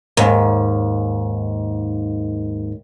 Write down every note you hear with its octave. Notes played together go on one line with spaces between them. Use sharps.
D#2 G#2